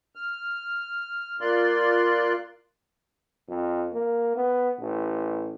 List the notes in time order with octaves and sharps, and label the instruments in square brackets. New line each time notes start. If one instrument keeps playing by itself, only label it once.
[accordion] F6
A#3 F4 D5 C6 F#6
[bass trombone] F2
A#3
B3
A1